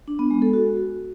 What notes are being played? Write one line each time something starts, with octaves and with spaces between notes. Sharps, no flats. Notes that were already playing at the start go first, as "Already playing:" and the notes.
D4
B3
G#3
A4
F#4